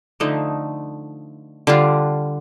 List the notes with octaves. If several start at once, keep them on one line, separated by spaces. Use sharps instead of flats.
D3 F3 A3 D#4
D3 G3 D4 F4